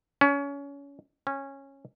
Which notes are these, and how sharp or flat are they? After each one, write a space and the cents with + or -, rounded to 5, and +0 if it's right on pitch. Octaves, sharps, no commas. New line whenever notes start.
C#4 +25
C#4 -15